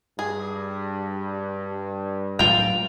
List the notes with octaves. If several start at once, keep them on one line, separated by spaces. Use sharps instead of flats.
G2 G#4
A2 F#3 G#3 F4 G5 F7